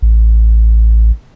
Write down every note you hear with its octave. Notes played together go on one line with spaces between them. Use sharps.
A1